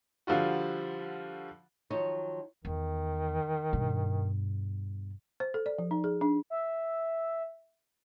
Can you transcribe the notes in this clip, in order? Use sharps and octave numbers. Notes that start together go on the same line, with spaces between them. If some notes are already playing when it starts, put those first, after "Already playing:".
D3 F3 G3 F4 F#4
D#3 F3 F#3 D#4 C#5
E2 D#3
G2 B2
C5
A4
D5
F3
D#4
G#4
D4
E5